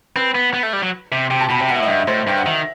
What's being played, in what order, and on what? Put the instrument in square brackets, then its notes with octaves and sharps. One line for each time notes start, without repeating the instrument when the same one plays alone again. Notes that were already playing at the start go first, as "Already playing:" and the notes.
[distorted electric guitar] C4 [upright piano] B4
[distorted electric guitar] B3
B3
A3
G3
F#3
C3
[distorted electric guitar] C3 [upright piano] G5
[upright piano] A5
[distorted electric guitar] B2 [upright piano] B5
[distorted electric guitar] C3 [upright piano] G5
[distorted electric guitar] B2 [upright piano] F#5
[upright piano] E5
[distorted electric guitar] A2 [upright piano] D#5
[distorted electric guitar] G2 [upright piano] E5
[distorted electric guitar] A2 [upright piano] C5
[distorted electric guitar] G2 [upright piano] G5
[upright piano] F#5
[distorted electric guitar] D#3 [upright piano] E5